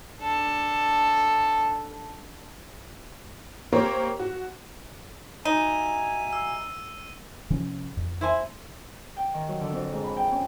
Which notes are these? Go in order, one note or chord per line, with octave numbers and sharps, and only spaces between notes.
D4 A4
A#3 C4 G4 A#4 C5 C#5
F#4
D#4 F#4 E5 G#5 D#7
E6
C3 F3 C#4
F2
E4 C5 G#5
G5
D#3
F#3
D3
F2
G#2
B5
G5
C#4